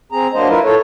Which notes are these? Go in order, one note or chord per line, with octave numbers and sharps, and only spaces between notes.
C4 G#4 A#5
F#3 A#3 D4 C5 D#5
E4 F4 A#4 B4
A4 C#5